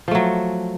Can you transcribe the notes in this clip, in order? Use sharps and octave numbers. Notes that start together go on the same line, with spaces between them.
F3 F#3 A3